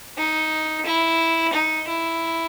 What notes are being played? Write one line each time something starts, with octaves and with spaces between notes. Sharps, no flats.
D#4
E4
D#4
E4